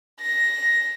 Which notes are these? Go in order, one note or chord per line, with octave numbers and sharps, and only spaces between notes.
A#6